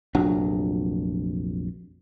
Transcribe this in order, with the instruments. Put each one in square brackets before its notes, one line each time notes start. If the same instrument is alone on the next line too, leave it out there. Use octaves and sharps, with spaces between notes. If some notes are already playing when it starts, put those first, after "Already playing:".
[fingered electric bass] F1 A#1 F#3 D4